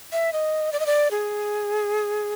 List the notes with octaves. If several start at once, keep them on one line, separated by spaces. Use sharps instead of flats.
E5
D#5
D5
D#5
D5
G#4